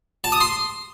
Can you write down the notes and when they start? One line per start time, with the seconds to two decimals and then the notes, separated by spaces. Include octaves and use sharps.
0.24 A5
0.32 D#6
0.40 C6